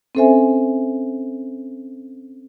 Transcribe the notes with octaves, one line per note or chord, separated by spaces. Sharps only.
C4 C#4 A4 C5 E5 G#5